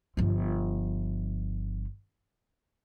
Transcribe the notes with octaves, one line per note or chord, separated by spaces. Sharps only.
G1 F3